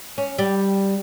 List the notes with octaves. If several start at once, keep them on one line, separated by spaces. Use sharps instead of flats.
C#4
G3